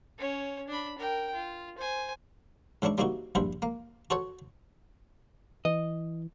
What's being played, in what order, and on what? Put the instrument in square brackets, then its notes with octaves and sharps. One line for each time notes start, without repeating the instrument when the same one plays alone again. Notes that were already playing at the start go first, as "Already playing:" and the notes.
[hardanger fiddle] C#4 C#5
D4 B5
A#4 G5
F4
C5 G#5
[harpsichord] G#2 E3 C#4 D4 E4
G3 A#3 C4 D#4 E4 F#4
A#1 G2 E4 C5 B5
A#3
F#4 A4 C5 C#5 F#5
[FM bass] E3 [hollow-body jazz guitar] D#5